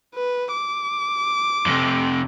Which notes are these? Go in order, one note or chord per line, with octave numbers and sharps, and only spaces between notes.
B4
D6
F2 C3